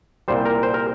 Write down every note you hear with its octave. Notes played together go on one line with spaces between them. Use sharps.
C2 A#2 G3 C5
A#4
C5
A#4